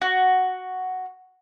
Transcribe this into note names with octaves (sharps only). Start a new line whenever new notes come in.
F#4